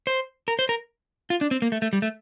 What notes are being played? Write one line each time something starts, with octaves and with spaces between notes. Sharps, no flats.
C5
A#4
C5
A#4
F4
D4
C4
A#3
A3
A3
G3
A3